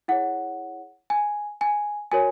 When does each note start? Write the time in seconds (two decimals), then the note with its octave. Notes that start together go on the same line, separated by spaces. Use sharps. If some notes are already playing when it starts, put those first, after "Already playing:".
0.08 E4 G#4 C#5 F#5
1.10 G#5
1.61 G#5
2.12 F#4 A#4 C#5 G#5